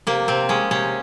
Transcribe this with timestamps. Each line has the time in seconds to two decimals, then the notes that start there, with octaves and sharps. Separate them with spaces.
0.07 C3 A#3
0.28 C3 C4
0.49 G#3 C#4
0.71 C3 C#4